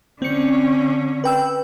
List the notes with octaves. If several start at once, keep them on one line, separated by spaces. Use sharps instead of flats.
D3 C4 C#4 C#7
B4 G5 E6